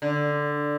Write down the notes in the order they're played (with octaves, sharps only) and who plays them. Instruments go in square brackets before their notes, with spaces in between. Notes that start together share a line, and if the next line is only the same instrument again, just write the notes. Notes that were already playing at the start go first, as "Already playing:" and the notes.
[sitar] D3